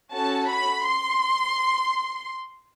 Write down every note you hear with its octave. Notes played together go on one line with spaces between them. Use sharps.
C#4 F#4 A4 A5
B5
C6